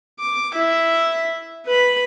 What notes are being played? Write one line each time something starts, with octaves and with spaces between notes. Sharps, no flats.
D6
E4 E5
B4 B5